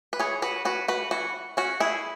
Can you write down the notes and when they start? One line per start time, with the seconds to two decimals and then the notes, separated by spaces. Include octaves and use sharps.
0.13 B4
0.19 E3 G#4 C#5
0.42 F#4 B4
0.65 C#4 F#4 B4
0.88 F#4 B4
1.11 E3 F#4
1.57 C#4 F#4
1.80 E4 G#4